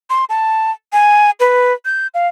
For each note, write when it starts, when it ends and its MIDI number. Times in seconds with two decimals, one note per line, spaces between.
0.10 0.25 84
0.30 0.71 81
0.93 1.30 80
1.40 1.73 71
1.85 2.07 91
2.14 2.28 77